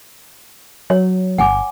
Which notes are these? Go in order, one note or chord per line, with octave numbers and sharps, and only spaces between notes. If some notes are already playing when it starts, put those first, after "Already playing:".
F#3 C#5
G1 F#5 G#5 D6